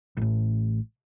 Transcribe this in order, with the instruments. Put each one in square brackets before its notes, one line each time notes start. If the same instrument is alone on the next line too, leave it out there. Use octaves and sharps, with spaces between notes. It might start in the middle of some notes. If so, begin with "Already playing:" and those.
[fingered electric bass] A1 A2